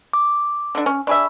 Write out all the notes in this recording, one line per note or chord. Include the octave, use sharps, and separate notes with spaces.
D6
D3 D4
C#4
D4 G#4 E5 B5 C#6